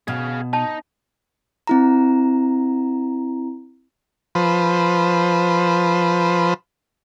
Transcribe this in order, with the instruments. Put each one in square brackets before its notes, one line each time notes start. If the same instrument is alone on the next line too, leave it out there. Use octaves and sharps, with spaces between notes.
[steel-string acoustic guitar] B2 [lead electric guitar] G#4 F5
[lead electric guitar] D#4 [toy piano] A5
[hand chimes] C4 E4 A#5
[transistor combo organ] F3 B4 C5